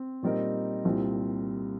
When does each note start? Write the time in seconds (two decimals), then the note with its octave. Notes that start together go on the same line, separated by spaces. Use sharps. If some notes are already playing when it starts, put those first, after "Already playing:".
Already playing: C4
0.23 A#2 G3 C4 D#4 A#4
0.85 C2 A#2 G3 C4